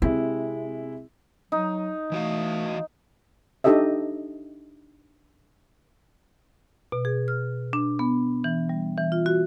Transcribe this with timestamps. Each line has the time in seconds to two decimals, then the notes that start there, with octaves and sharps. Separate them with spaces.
0.02 C3 G#3 C4 E4
1.52 F#3 D#4
2.12 E3 A3 F#4 F5
3.64 D4 D#4 G4 A4 D#5 E5
6.92 B2
7.05 G#4
7.28 F6
7.73 D4
7.99 B3
8.44 E3
8.69 G3
8.97 E3
9.12 F4
9.26 F#4